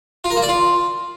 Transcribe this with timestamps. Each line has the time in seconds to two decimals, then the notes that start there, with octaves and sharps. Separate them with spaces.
0.24 F4
0.30 A#4
0.37 A#3
0.43 D5
0.49 F4